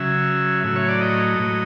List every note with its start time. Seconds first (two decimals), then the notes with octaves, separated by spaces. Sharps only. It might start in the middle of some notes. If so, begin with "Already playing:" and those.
Already playing: C#3 F#3 E5
0.64 A2 F#3 E5
0.76 C#5
0.89 D5
1.01 D#5
1.39 A2 F#3